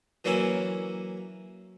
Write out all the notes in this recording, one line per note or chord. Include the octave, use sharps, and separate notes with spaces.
E3 F#3 A#3 C#4 E4